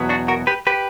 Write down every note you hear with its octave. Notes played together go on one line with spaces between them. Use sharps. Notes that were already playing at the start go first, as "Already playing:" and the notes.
Already playing: E2 B2 F#3 B3
D4 F#4
F#4 A#4
G4 B4
G4 B4